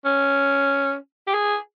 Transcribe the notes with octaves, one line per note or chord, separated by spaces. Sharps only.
C#4
G4
G#4